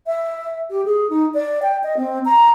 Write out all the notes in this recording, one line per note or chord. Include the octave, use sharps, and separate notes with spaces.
E5
G4
G#4
D#4
D5
G5
D#5
C4
A#5